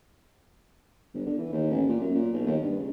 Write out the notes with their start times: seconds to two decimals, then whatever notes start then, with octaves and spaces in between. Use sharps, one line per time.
1.14 G1
1.27 D3
1.39 E3
1.53 D#2
1.71 A1
1.89 A#2
2.01 F#2
2.15 A#2
2.33 B1
2.47 D#2
2.63 G2
2.79 C#2